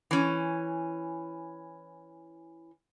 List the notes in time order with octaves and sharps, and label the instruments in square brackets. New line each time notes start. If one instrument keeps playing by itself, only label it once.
[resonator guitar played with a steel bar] E3 C#4